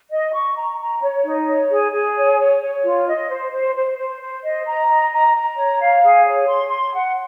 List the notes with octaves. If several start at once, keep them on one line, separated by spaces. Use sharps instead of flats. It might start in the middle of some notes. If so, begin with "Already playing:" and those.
D#5
C#6
A#5
A#5
C#5
D#4
C#5
G#4
G#4
C#5
C#5
C#5
F4
D#5
C5
C5
C5
C5
C5
D#5
A#5
D#5
A#5
A#5
C#5
F5
G#4
C#5
C6
C6
F#5